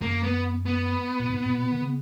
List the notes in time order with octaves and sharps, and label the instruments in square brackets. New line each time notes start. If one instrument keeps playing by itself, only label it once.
[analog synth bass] F#2 [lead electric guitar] A#3
[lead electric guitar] B3
B3
[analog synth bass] A#2
G#2
A#2
B2
A#2
D#3
C#3